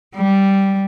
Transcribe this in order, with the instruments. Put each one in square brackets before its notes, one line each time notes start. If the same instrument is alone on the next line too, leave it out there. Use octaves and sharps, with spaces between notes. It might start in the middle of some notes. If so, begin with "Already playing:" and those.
[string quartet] G3